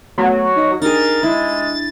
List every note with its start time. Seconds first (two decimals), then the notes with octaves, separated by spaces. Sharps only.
0.18 F#3 A3 B3 C#5
0.43 F#4
0.56 D#4 D#5
0.82 D4 D#4 G4 G#4 A#4 A6
1.23 G#3 E4